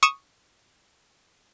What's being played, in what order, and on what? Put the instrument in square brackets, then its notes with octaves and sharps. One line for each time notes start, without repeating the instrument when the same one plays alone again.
[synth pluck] C#6 D#6 C#7 E7